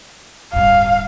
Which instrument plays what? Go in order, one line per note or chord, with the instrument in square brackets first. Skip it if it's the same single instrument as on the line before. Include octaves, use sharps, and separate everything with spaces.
[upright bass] D1 G2 [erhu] F5